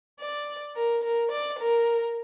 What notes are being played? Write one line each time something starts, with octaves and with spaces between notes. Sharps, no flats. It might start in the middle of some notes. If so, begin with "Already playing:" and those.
D5
A#4
A#4
D5
A#4